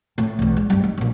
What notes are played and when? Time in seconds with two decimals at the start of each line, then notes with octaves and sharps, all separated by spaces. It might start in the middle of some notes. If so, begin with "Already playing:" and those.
0.18 A2
0.39 B1 E2
0.57 G#3
0.70 G2 G3
0.84 D#4
0.98 A#1 A#2